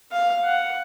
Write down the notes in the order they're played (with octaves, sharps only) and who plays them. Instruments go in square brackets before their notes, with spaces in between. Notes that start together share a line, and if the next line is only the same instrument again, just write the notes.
[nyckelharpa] F5
F#5